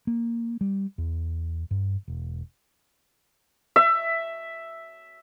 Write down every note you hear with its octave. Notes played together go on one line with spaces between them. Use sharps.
A#3
G3
E2
G2
E1
E5